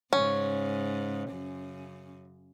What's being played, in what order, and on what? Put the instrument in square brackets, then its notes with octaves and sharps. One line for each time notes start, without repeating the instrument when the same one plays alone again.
[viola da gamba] G#2 C#3 [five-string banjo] C#4
[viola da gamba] F#2 C#3